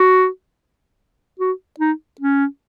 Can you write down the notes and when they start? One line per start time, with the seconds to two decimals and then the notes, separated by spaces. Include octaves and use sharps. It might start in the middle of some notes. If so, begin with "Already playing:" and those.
Already playing: F#4
1.40 F#4
1.80 D#4
2.21 C#4